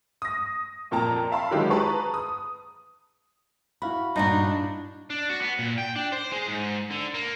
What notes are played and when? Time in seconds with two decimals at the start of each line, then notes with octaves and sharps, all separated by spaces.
0.22 D#6 A#6
0.91 F2 A#2 G5 A5 A#5
1.32 E5 F5 A5 B5 C6
1.51 D3 D#3 F#3 G#3 E4 G4
1.70 G#4 B4 A5 A#5 C#6
2.14 D#6
3.82 E4 F#4 F5 B5
4.16 G2 A#2 D4 D#4 F#4
5.10 D4
5.30 F#4
5.41 B3
5.59 A#2
5.78 G5
5.96 D4
6.12 C5
6.32 G#3
6.49 G#2
6.91 D3
7.14 A#3